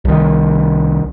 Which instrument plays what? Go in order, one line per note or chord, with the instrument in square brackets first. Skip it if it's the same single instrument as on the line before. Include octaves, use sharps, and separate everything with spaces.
[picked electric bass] C2 D#3